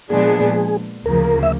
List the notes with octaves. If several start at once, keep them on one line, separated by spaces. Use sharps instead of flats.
A#2 F3 G#3 B3 D4 G#4
D2 C#3 F3 A#3 A#4
E5